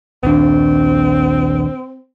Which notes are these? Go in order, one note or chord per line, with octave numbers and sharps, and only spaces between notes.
A#1 D#2 C4 D4